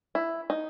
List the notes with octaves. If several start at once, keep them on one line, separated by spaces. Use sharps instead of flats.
E4
D#4